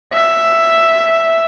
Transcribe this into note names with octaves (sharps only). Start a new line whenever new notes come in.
E5